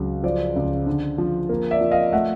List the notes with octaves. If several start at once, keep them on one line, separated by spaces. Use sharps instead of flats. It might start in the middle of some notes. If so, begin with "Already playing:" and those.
Already playing: C#2 F#3
F3 C5 D5
C#2
D3
F3
A#3
D5 E5
F3
D#5 F5
A3 E5 F#5